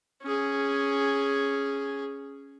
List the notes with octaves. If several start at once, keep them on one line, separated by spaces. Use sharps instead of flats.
C#4 G#4